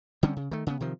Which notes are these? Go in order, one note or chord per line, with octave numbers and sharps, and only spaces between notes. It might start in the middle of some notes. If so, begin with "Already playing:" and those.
D3 G3 C4 C#4
C#3
D#3 A3
C#3 B3
C3 D#3 F3